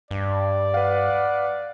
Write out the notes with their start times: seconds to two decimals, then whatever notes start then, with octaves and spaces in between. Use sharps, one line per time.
0.11 G2 D5
0.74 B4 F5 F#5